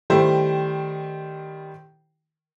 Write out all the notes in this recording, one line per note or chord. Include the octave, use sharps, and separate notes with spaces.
D#3 G3 A3 E4 G4 C5